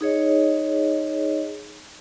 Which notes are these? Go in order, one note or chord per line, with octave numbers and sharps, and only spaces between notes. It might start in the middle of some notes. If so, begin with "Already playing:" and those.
D#4 G#4 C#5 D#5